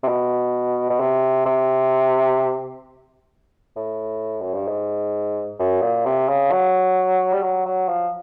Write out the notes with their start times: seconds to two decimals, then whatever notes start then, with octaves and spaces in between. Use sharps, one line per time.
0.04 C3
0.08 B2
0.90 B2
1.00 C3
1.46 C3
3.76 A2
4.41 F#2
4.54 G2
4.68 G#2
5.60 F#2
5.83 A#2
6.06 C3
6.29 C#3
6.52 F#3
7.33 G3
7.43 F#3
7.66 F#3
7.89 F3